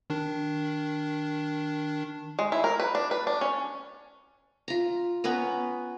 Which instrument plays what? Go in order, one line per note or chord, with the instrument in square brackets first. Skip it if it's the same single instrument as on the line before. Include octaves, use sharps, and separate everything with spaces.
[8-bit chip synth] D#3 D4
[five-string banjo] G#3
E4
A#4
B4
D4
B4
D4
C#4
[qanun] F4 A#5
B3 C#4 B4 A#5